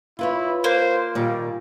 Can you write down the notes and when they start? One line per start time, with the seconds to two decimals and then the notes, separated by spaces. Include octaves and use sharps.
0.19 E4 F4 B4 C#5
0.64 A#3 C5
1.15 A#2 D#3 G3